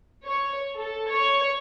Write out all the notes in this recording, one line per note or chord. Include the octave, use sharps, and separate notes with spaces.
C#5
A4
C#5